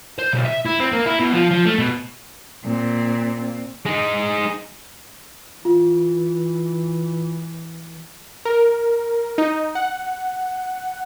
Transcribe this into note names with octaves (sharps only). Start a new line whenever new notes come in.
C5
B1
E5
E4
C4
A#3
E4
B2
F3
F3
A3
B2
A#2 C4
G#3 D#4
E3 F4
A#4
D#4
F#5